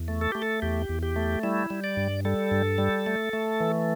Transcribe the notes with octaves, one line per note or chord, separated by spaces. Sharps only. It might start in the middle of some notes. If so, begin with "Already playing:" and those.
Already playing: E2
A3
A4
A3 G4
A4
E2 G4
E2
G4
A3
G3 E4
G3
D5
G2
G3 A4
G2
G3
A3
A3
E3